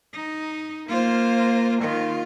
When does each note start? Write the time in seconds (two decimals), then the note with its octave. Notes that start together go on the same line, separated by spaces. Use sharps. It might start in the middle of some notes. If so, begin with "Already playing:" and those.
0.14 D#4
0.89 A#3 F4 C5
1.82 D#3 F4